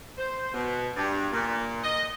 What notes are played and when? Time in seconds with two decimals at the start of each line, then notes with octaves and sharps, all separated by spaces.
0.17 C5
0.53 B2
0.96 G2
1.32 A#2
1.82 D#5